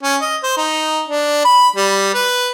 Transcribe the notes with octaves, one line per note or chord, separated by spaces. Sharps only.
C#4
D#5
C5
D#4
D4
B5
G3
B4